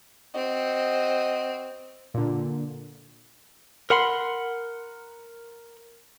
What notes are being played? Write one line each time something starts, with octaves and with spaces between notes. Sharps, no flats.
C4 F#4 D#5
A#2 D3
A#4 F#5 B5 C6